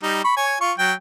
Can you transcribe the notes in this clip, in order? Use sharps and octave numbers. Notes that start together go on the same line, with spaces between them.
G3 D#4
B5 C#6
C#5 G#5
F4 C#6
F#3 G5